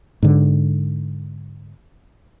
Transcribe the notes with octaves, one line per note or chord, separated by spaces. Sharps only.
G#2 D3